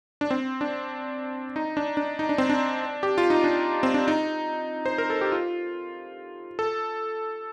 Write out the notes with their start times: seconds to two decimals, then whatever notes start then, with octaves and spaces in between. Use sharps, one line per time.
0.21 D4
0.31 C4
0.61 D4
1.56 D#4
1.77 D4
1.97 D4
2.19 D#4
2.29 D4
2.38 C4
2.49 D4
3.03 G4
3.18 F4
3.30 D#4
3.44 D4
3.83 C4
3.94 D4
4.08 D#4
4.86 C5
4.98 A#4
5.10 A4
5.21 G4
5.32 F4
6.59 A4